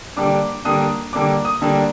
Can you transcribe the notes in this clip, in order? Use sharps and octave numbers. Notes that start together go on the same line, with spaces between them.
D3 G3 A#3 D4 D6
D3 G3 A#3 D4 D#6
D3 G3 A#3 D4 D6
D#6
D3 G3 A#3 D4